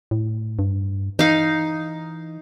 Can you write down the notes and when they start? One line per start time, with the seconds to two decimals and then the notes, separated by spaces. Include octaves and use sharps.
0.11 A2
0.59 G2
1.19 E3 D#4 F5